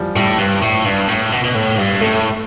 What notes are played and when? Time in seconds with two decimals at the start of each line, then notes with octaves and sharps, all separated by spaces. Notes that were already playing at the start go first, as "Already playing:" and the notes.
Already playing: E3 F3 G3
0.16 A2 G3
0.38 G2
0.62 A2
0.85 G2
1.08 A2
1.32 B2
1.44 B2
1.55 A2
1.78 G2
2.01 A2 A3